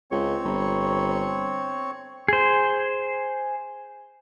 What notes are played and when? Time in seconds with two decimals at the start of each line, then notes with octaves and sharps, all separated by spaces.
0.11 C#2 C4 C#5 C#6
0.45 G1
2.28 G#4 C5